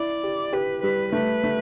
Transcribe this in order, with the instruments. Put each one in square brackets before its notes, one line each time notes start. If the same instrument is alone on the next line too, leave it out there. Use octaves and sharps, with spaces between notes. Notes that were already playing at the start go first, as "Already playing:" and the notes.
Already playing: [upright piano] E4 [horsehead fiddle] D5
[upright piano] G4
[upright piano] G4 [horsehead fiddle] B4
[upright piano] G3 [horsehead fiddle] B4
[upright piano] A3 [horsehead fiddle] B4
[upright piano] A3